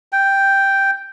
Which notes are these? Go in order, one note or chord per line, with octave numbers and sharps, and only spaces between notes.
G5